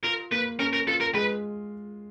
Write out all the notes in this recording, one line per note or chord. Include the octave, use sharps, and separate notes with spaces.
F4 A#4
A#3 B4
C#4 A#4
A#4
F4 A4
A#4
G#3 B4